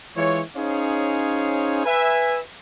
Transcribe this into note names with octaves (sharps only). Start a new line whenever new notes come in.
E3 G#3 F4 C#5
C#4 D#4 G#4 C5 C#5 F5
B4 E5 G#5